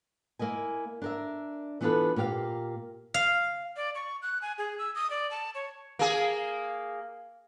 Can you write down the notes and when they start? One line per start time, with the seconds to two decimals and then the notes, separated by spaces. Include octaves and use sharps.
0.39 A#3 E4 D#5 G#5
1.02 D4 A#4 E5
1.81 E3 B3 D4 F4 A4 B4
2.16 A#2 A#3 G4 D5 F5
3.14 F5
3.76 D5
3.95 C#6
4.22 F#6
4.42 G#5
4.58 G#4
4.79 E6
4.95 D#6
5.10 D5
5.31 A5
5.55 C#5
5.99 A#3 G#4